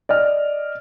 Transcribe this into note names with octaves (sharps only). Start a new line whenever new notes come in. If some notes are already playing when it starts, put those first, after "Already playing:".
D5 D#5 F6